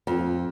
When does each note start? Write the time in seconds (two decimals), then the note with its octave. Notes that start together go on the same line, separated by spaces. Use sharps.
0.07 F2